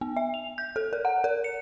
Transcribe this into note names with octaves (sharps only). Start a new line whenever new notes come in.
B3
E5
F7
G6
A4
A#4
F#5
A#4
C#7